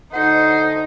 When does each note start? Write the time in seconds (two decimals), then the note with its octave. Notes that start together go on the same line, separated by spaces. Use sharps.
0.13 D2 D#4 A4 C5 D#5 F#5